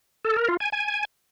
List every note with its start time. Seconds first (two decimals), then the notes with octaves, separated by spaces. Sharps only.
0.25 A4
0.36 A#4
0.48 F4
0.60 G#5
0.72 G#5